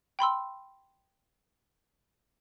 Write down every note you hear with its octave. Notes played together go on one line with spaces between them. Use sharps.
G5 B5 C6 E6